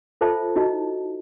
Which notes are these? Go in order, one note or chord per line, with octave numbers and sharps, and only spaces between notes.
F4 A4 C5 E5 A5
D#4 E4 F#4 D#5